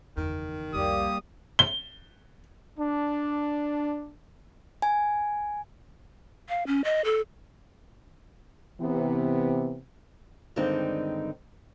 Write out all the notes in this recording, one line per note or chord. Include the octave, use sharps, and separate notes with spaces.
F#1 E2 D#3
C2 F2 G3 A#3 G4 D#6
G7
D4
G#5
F5
C#4
D#5
A4
C3 E3 B3
G2 D3 D#3 G#3 C4 D#4